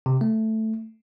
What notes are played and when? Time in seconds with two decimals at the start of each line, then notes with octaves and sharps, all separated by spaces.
0.06 C3
0.21 A3